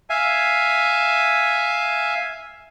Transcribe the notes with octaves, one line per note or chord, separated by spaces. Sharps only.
E5 F5 G#5